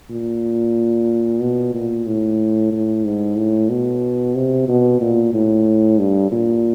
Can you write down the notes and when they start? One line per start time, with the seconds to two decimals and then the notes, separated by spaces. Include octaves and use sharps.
0.10 A#2
1.41 B2
1.74 A#2
2.06 A2
2.72 A2
3.04 G#2
3.37 A2
3.70 B2
4.35 C3
4.68 B2
5.01 A#2
5.34 A2
5.99 G2
6.32 A#2